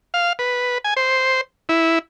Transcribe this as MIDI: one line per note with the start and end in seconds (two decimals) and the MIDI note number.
0.14 0.33 77
0.39 0.78 71
0.84 0.94 80
0.97 1.41 72
1.69 1.99 64